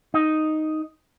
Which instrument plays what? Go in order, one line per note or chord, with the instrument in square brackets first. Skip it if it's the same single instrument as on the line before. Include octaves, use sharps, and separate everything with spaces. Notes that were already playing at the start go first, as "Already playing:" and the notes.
[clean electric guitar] D#4